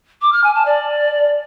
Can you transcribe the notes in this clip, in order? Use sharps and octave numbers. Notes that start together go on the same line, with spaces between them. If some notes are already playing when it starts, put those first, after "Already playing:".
D6
F6
G#5
A5
D5